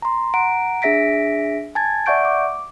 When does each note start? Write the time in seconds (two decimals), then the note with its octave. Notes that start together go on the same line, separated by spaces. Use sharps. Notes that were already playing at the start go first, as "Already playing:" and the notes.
0.02 A#5 C6
0.34 F#5 A#5 D7
0.82 D4 G#4 E5 A#6 B6 D7
1.75 G#5 A5 G#6 A6
2.06 D5 E5 F#5 C#6 G6 D7
2.25 D6